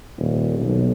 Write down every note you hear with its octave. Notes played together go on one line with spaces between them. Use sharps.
D#1
B1